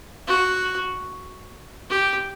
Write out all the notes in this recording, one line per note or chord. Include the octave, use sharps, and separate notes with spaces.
F#4
G4